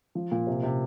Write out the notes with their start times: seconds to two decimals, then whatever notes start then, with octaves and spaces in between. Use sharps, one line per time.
0.15 F3
0.32 A#2
0.47 C3
0.63 C3